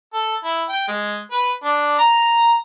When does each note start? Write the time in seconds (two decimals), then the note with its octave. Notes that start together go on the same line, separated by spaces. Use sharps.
0.14 A4
0.44 E4
0.69 G5
0.88 G#3
1.32 B4
1.64 D4
1.99 A#5